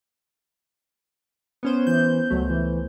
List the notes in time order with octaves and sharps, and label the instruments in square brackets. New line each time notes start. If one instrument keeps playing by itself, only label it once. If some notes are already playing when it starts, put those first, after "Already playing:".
[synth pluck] B3 C#4 C5
[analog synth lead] E3 [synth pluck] G6
[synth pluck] C#2 A3 [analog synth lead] F#3
[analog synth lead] E3